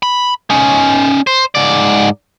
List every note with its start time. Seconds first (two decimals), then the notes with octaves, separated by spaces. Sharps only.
0.03 B5
0.50 C#4 D#4
1.27 C5
1.55 G#2 D5